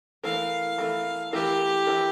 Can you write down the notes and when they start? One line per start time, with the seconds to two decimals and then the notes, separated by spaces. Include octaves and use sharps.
0.24 E3 A3 E4 A#4 F5
0.78 E3 A3 E4 A#4
1.33 E3 A3 E4 G4 A#4
1.87 E3 A3 E4 A#4